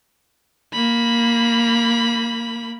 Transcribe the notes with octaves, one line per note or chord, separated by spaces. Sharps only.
A#3 B5